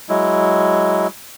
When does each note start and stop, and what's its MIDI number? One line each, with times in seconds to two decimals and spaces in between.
0.09 1.07 54
0.09 1.07 56
0.09 1.07 64